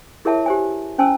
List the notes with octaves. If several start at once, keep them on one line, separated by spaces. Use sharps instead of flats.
E4 G#4 A#4 C#5 E5 A5
G4 C5 G#5
C#4 C5 G#5 A5 E6